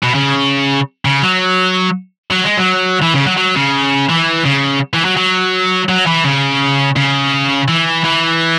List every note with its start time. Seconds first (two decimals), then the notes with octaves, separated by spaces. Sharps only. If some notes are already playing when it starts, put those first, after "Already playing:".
0.03 B2
0.15 C#3
1.05 C#3
1.23 F#3
2.31 F#3
2.44 G#3
2.57 F#3
3.02 E3
3.14 C#3
3.26 F#3
3.37 F#3
3.56 C#3
4.09 E3
4.45 C#3
4.94 E3
5.05 F#3
5.17 F#3
5.89 F#3
6.06 E3
6.24 C#3
6.96 C#3
7.68 E3
8.05 E3